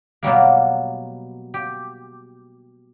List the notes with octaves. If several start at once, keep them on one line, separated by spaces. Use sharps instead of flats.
B2 F#3 G3 A#3
G4